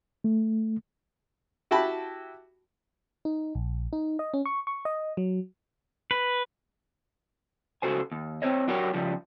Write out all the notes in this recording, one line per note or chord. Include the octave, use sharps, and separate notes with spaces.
A3
E4 F#4 G4 G5 A5 B5
D#4
A#1
D#4
D#5
C#4
C#6
C#6
D#5
F#3
B4
C#3 F#3 F#4 A4 C5 G#5
D#2
C4 C5 C#5 D#5
F#3 D4 F#4 G4 A#4 C#5
C#3 F3 G3